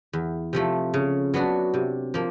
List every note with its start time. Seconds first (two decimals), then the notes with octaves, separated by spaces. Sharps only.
0.13 E2
0.53 C3 F3 A3
0.94 C#3
1.34 F#3 B3 D4 F#4
1.74 C3
2.14 F3 A#3